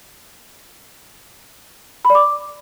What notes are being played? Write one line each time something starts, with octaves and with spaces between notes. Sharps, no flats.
B5
D5
D6